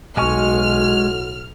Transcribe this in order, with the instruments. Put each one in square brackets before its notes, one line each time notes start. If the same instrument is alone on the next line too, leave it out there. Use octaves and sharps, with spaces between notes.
[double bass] B1 [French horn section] A2 F#4 [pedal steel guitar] G#3 G#5 C#6 [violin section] F6